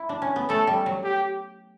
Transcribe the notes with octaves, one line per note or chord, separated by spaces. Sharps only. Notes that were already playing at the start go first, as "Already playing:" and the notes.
Already playing: E4
D4
C#4
B3
A3 A4
G3
F#3
G4